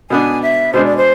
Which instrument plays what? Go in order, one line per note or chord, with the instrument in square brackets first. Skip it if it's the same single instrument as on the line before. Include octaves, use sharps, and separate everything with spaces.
[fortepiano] B2 B3 D4 [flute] G#5
[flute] E5
[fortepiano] B2 G#3 D4 [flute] C5
[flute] D5
C5